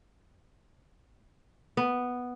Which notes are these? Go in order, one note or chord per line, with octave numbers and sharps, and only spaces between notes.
B3